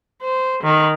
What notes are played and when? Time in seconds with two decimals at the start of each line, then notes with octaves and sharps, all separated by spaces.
0.22 C5
0.63 D#3